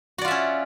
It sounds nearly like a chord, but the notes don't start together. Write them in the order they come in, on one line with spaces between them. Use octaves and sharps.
F#4 D5 F4 E5 C#4